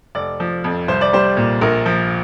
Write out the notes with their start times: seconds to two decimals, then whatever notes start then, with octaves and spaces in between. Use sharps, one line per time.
0.15 F1 D5
0.40 F3
0.64 F2
0.88 C2 C5
1.01 D5
1.13 G3 C5
1.37 A#2
1.61 A#1 A#4
1.86 F3